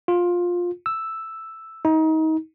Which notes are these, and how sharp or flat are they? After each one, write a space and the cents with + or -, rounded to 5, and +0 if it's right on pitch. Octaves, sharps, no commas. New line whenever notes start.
F4 +15
E6 +0
D#4 +30